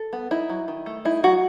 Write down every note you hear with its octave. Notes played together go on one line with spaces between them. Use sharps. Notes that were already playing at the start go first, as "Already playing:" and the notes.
Already playing: A4
B3
D#4 E4
F#3
D#3
A3
D#4 E4
F#3 F#4